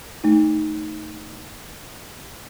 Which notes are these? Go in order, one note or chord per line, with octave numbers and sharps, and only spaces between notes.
A3 D#4